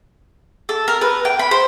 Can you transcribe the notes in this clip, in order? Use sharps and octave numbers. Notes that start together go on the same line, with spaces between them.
A4
A#4
B4
G5
B5
C5